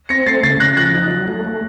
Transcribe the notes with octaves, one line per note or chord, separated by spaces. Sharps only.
C4 A#6 C#7
A3 A6 C7
C#3 A6 C7
C#3 F#6 A#6
F3 F#6 A#6
D#4
F#3
A3
A3